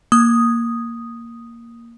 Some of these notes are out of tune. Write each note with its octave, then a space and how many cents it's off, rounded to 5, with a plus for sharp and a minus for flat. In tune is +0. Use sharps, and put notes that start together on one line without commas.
A#3 +0 D#6 +0